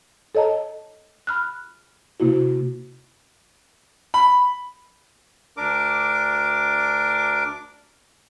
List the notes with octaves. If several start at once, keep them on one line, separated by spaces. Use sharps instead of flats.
A4 C#5 D#5 A5 A#5
B5 F6 F#6
C3 A#3 E4 F#4
B5
D2 D4 A#4 D6